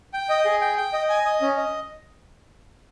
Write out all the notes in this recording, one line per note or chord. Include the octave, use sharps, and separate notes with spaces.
G5
D#5
G#4
G5
G5
D#5
G#5
D#5
C#4
D#5